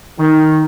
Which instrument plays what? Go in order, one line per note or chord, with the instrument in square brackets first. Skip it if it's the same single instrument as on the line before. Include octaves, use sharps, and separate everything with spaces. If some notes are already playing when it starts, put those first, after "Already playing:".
[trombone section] D#3